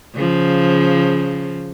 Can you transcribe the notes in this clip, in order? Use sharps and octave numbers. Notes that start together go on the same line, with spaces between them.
C#3 F3